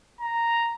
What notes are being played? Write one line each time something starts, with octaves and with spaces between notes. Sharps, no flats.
A#5